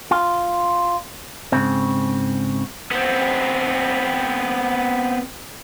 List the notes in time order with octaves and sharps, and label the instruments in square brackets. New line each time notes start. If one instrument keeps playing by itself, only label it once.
[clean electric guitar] F4
G#2 C#3 C4
[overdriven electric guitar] B3 C4